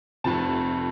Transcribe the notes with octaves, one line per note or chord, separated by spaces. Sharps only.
F1 F2 C3 A5